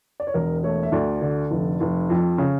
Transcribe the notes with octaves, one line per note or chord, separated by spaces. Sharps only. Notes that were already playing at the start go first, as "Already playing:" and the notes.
D5
C#5
E1 A#4
A3 C#5
E5
D2 D5
D3
F1
F1
F2
C#3